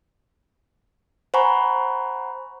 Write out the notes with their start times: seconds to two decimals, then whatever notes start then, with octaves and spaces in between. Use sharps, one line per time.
1.34 C5 F#5 G#5 A#5 B5 C#6